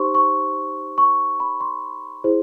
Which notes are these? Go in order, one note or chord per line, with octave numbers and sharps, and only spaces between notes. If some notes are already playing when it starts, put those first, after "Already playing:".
Already playing: D#4 G4 C5 C6 C#6
C#6
C#6
B5
C6
E4 G#4 C5